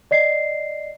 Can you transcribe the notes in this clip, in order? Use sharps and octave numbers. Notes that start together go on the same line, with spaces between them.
D5 D#5 C7